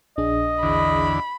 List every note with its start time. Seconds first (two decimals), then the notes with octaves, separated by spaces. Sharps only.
0.17 A#1 D4 G#4 D#5
0.63 E2 D3 B5